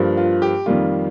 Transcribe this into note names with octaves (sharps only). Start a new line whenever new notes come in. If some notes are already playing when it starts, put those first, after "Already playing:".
Already playing: G2 F3 A#3
F4
G4
F2 D#3 G3 A#3 F4